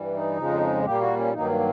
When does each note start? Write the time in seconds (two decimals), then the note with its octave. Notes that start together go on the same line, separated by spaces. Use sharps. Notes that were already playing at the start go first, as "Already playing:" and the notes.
Already playing: G2 E3 G3
0.14 D#4
0.37 F2 C#3 F3 G#3
0.85 A#2 G3 A#3 G4
1.01 F#4
1.17 C#4
1.33 G2 D#3 F#3 A#3 D#4